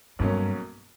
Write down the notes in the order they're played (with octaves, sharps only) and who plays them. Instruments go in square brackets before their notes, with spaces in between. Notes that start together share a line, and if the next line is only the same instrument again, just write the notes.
[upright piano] B1 B2 F#3 A#3 C#4 [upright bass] G2